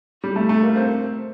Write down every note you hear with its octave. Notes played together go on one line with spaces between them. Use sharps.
G3
A3
A3
A#3
C4